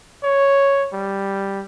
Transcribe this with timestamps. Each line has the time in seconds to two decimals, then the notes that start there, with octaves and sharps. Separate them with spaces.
0.23 C#5
0.93 G3